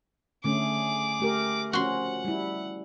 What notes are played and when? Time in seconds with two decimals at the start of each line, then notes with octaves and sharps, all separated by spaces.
0.44 D3 A3 C#4 G#4 D6
1.20 A3 G4 A#4
1.73 F3 C#4 F#4 F#5 C6
2.24 G3 E4